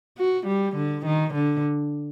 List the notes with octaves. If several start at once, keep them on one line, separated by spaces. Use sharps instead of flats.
F#4
G3
D3
D#3
D3